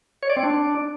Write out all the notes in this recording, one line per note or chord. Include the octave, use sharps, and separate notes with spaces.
C#5
D5
C4
D4